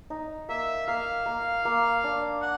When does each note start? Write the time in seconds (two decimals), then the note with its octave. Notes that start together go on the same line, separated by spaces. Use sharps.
0.10 D#4
0.49 A#3 E5
0.87 A#3 F5
1.26 A#3
1.65 A#3
2.04 D4
2.42 F#5